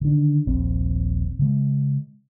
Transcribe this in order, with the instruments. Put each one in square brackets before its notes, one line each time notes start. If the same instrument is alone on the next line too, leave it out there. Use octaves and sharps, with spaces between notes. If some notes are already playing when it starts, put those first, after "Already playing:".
[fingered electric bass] D3 D#3 D4
D#1 A#1 C4
C#3 G#3